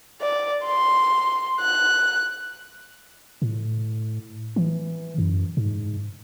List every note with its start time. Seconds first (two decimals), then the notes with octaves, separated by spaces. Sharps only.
0.21 D5
0.64 C6
1.61 F#6
3.42 A2
4.56 E3
5.18 F#2
5.57 G#2